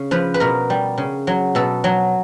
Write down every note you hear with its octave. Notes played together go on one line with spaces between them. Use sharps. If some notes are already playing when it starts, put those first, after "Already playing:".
Already playing: C#3
F3 B4
B4
B2 A#4
G3
C#3
F#3
B2 A4
F#3